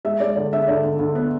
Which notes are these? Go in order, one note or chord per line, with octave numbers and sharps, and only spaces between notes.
G#3 E5
G#3 D5
D2 D5
D3 E5
D2 D5
D2
D2
B3